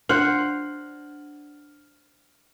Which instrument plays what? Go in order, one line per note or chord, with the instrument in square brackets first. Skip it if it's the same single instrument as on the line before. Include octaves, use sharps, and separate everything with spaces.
[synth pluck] D4 [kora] C5 F#5 [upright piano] F6 F#7